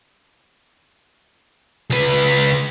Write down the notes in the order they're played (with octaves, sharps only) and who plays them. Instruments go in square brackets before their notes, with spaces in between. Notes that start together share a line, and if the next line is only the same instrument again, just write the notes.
[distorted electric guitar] C#2 B4